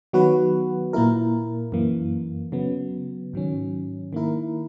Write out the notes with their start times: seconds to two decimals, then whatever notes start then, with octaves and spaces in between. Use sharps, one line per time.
0.13 D#3 F#3 B3 F#4 B4
0.93 A#2 A#3 E4 A#4
1.72 F#2 E3 A#3
2.52 C#3 F#3 B3
3.33 G#2 D#3 F#3 C#4
4.13 D#3 A#3 E4 A#4